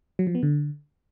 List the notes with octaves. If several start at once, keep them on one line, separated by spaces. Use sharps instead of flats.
F#3
F3
B3
D3